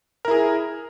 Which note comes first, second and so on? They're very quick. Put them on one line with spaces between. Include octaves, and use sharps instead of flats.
A#4 E4 G#4